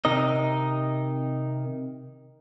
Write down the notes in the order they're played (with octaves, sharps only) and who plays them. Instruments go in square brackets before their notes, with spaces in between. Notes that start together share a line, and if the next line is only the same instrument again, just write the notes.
[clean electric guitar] C3 D#3 D#4 D#5